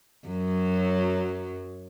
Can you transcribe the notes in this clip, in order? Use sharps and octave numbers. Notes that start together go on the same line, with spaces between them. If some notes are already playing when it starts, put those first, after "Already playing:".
F#2 F#3